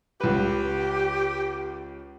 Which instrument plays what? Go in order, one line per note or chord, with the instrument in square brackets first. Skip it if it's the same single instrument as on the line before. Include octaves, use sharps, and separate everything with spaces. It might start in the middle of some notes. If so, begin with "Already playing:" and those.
[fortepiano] C#2 B4 [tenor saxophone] G4